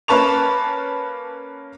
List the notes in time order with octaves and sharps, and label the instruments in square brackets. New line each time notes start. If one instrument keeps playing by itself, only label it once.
[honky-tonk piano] A#3 C#4 B4 A5 C#6 F7